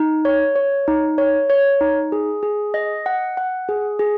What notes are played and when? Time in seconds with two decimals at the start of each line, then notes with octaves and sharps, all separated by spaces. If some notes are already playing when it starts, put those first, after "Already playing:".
Already playing: D#4
0.25 C#5
0.56 C#5
0.88 D#4
1.18 C#5
1.50 C#5
1.81 D#4
2.12 G#4
2.43 G#4
2.74 D#5
3.06 F#5
3.37 F#5
3.69 G#4
3.99 G#4